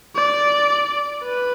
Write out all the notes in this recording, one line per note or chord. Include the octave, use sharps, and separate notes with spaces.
D5
B4